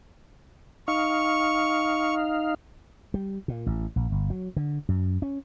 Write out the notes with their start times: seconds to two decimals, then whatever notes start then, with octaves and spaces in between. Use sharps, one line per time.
0.88 D#4 F5 C#6
3.14 G3
3.48 A#2
3.66 A1
3.96 A#1
4.12 G1
4.30 F#3
4.56 D3
4.89 F#2
5.22 C#4